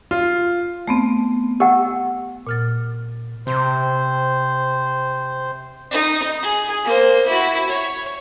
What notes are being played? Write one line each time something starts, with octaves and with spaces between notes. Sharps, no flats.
F4
A3 B3 C4
G4 F#5 E6
A#2 F6 A6
C3 C5
D#4
G#4
A#3 C5
E4 F#4
C#5